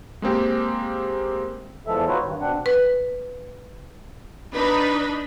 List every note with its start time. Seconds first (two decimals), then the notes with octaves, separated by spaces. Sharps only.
0.22 G#3 A#3 C4 G4
1.87 E2 E3 F3 G#3 A4 E5
2.08 D#4 F4 F#4 B4 C#5
2.23 G2 D#3
2.40 B2 C4 D4 F#5
2.66 B4
4.53 D4 D#4 B4 B5